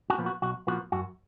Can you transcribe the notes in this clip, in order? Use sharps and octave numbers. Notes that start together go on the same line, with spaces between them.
F#4
A#2 F3 B3
F#4
B1 F#4
A#2 F3 B3 F#4
F#2 F#4